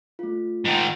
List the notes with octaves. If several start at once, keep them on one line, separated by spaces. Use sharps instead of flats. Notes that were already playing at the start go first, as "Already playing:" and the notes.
A3 F4
G#2 D#3